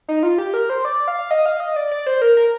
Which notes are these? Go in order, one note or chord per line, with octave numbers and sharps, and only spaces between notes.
D#4
F4
G4
A#4
C5
D5
F5
D#5
F5
D#5
D5
D5
C5
A#4
A#4